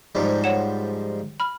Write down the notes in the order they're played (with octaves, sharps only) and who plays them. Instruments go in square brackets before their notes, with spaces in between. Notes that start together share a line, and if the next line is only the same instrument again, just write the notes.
[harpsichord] G#2 F3 G3
[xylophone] C#5 F#5 E7
B5 F6